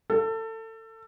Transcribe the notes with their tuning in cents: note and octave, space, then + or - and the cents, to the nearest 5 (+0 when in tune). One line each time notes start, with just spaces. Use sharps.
A4 +25